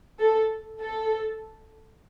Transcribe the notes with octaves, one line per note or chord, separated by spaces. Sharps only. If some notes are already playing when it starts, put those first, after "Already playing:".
A4
A4